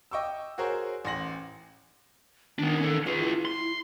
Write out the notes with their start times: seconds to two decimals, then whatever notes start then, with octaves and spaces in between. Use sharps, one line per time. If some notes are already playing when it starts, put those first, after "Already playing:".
0.11 D#5 G5 C#6 D6 E6
0.58 F#4 G#4 A#4 C5 C#5
1.05 A1 C6 A#6 F#7
2.59 D#3 B3 D4
2.79 C#4 A4
3.07 F4 G#4 B4
3.20 E4
3.45 C6